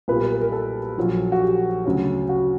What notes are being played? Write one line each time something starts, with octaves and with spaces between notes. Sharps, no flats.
B1 A#2 G3 B4
A#4
A#4
A#4
A4
A#1 A#2 F#3
F#4
G4
D2 C#3 F#3
F#4